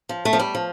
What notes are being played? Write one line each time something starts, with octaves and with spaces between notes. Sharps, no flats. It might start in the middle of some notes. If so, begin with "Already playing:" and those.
F3
A3
F3
G3
F3